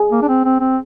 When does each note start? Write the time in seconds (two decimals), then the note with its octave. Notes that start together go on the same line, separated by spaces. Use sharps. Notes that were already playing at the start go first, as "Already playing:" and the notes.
Already playing: G#4
0.12 A#3
0.22 D4
0.28 C4
0.45 C4
0.60 C4